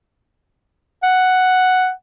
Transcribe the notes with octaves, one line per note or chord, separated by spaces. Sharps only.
F#5